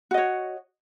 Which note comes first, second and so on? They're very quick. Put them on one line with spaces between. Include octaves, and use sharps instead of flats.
F#4 D#5 C#5